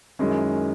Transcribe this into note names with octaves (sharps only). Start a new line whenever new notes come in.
F#2 D#3 G#3 C#4 E4